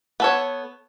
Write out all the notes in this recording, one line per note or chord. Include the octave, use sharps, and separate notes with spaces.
B3 A4 C#5